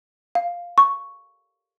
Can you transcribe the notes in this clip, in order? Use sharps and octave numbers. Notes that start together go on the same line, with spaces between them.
F5
C#6